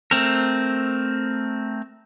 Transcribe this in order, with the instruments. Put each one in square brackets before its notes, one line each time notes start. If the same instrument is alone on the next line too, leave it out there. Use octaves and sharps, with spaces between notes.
[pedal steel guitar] A3 C4 A#4